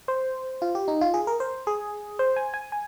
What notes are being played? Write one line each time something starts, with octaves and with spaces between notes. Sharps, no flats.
C5
F4
G4
D#4
F4
G#4
A#4
C5
G#4
C5
G#5
G#5
G#5